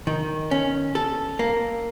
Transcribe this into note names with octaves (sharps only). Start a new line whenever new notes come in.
D#3
C#4
A4
A#3